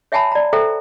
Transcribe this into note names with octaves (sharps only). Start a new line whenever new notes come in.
C#5 E5 F#5 G#5 A5 B5
D5 A#5
A4 C5 E5 G5 A#5